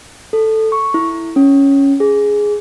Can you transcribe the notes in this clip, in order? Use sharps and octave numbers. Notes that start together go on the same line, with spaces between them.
A4
C#6
E4
C#4
G#4